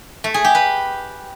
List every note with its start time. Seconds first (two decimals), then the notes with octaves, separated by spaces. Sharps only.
0.24 A3
0.34 G#4
0.44 G4
0.55 B4